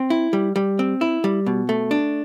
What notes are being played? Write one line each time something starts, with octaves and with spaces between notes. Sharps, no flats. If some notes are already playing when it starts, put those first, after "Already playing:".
Already playing: C4
E4
G3
G3
C4
E4
G3
B2
A3
D4